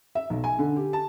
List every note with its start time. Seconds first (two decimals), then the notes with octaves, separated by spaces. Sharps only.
0.15 E5
0.30 B1
0.44 G#5
0.59 D3
0.76 G4
0.93 A5